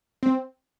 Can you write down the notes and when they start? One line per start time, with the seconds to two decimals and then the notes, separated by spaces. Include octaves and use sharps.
0.23 C4